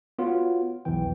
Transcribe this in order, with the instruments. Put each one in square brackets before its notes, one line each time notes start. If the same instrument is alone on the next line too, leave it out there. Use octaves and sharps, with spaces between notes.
[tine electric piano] B3 F4 F#4 C#5
B1 E2 E3 G5